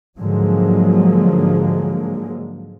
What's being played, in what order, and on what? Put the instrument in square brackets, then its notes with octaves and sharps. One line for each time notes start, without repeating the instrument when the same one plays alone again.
[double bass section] G#2 D3 F3 F#3 G#3 A#3